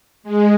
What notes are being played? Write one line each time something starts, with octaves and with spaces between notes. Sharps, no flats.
G#3